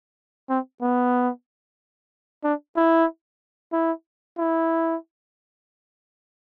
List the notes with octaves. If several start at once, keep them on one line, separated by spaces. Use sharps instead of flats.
C4
B3
D4
E4
E4
E4